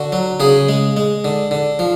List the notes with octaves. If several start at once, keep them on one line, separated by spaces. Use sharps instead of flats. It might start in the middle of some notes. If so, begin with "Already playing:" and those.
Already playing: D3 F#4
F#3
C#3 G#4
G#3
G#3
D3
D3
F3